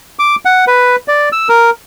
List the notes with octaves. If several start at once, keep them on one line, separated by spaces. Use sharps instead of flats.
D6
F#5
B4
D5
E6
A#4